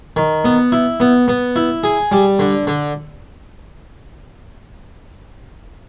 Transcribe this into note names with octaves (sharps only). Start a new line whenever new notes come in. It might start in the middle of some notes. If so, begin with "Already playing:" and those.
D#3
B3
E4
B3
B3
E4
G#4
G3
D3
D3